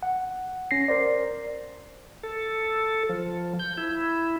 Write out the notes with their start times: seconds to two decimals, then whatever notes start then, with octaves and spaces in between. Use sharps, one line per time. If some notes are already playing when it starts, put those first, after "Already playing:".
0.03 F#5
0.71 C#4 A#6 C7
0.88 A#4 C5 D5
2.23 A4
3.09 F3
3.59 G6
3.77 E4